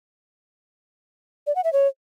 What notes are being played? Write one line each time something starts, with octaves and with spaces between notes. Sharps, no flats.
D5
F#5
E5
C#5